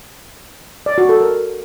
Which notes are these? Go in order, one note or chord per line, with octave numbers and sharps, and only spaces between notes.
D5
F#4
A4
A#4